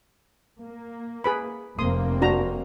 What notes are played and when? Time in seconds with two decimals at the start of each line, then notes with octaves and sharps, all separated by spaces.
0.61 A#3
1.24 G#4 B4 B5
1.79 F1 A#3 C4 C6 D#6
2.22 D4 F#4 A#5